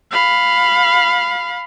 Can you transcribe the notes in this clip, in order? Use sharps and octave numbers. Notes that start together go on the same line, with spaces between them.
F5 B5